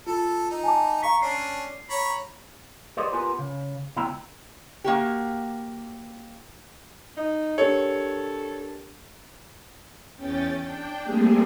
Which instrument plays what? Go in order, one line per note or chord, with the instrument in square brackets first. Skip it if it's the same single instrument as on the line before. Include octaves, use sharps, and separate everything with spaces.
[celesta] F4 [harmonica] A4
[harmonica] D#4
[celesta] G#5 A5 D6
[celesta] F5 A#5 B6 [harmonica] C#6
[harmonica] C#4 D4 [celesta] C7
[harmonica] C#5 A#5 B5
[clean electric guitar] G4 G#4 B4 C5 D5 D#5
B3 F4 G4 A#4 B4 G#5
C#3
C#2 B3 E4 G5 A#5
[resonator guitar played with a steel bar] A#3 F#4 G4
[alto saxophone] D#4
[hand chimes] D4 G4 A#4 [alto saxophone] A4 [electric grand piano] C#5
[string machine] E2 C#4 G5 A6
D4 G5
G3 A3 A#3 C4 G4 G#4